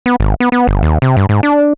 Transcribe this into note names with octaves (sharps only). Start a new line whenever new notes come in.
B3
G#1
B3
B3
G1
D#2
C3
G2
G#2
D4